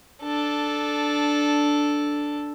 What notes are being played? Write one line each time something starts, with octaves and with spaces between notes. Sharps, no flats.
D4 A4